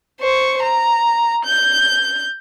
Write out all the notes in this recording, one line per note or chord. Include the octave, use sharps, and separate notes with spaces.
C5 C#6
A#5
G6